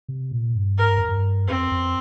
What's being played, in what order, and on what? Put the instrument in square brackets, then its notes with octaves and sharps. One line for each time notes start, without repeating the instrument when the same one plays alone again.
[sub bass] C3
A#2
G2
[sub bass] G#2 [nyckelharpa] A#4
[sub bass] G2
F2
G2
[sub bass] F2 [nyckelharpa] C4
[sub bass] F2